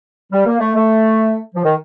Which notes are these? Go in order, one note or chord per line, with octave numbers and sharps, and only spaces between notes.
G3
A#3
A3
A3
F3
D#3